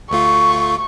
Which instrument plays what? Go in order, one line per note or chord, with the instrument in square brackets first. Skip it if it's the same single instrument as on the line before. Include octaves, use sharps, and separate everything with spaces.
[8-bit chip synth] D2 A3 F4 [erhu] C#6